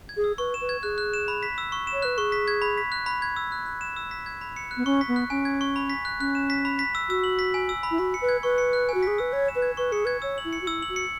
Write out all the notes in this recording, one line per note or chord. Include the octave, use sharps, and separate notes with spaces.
G#6
G#4
E6
B4 C#6
E7
B4
G#6
G#4 F#6
F#6
E7
B5
B6
E6
C#6
E7
C#5
B4 F#6
G#4 C#6
B6
G#6
B5
B6
F#6
B5
G#6
E6
F#6
F#6
E7
E6
B6
G#6
B5
C#7
F#6
B3
C#4 C#6
B6
B3
F#6
C#4 G#5
G#6
C#6
B5
B6
F#6
C#4 F#6
E7
B6
B5
B6
E6
F#4 E6
F#7
B6
G#5
E6
B5
E4
F#4 B5
C#7
B4
G#6
B4 C#6
C#7
F#6
G#5
F#4
G#4 B6
B4 E6
C#5 B5
E7
B4
G#6
B4 C#6
G#4 C#7
B4 G#6
C#5 E6
F#7
E4
C#7
F#4
E4 E6
F#7
F#4
C#7